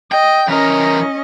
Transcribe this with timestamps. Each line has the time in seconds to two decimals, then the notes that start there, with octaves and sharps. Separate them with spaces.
0.12 D#5 G5
0.48 E3 C#4 A#4 D#5